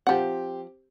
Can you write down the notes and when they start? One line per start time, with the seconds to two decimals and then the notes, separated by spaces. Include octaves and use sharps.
0.07 F3 C4 G4 F#5